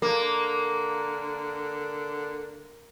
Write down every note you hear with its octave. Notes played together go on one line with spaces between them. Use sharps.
D3 A#3